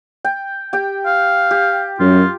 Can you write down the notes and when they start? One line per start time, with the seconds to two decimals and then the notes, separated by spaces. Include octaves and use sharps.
0.25 G5
0.73 G4 G5
1.06 F5
1.51 G4
1.99 F#2 F4